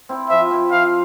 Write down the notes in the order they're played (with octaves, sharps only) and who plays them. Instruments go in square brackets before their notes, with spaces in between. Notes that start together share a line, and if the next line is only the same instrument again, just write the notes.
[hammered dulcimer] C4 E4
[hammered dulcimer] F3 [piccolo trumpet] E5
[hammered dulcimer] C4 E4
[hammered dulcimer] F3 [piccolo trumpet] F5